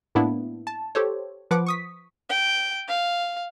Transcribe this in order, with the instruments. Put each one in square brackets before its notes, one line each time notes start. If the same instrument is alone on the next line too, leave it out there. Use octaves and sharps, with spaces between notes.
[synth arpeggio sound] A2 A#3 B3 D4 E4
A5
G4 A4 C5 C#5
F3 B4 F#5 D6
C#6 D#6 B6
[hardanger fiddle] G5
F5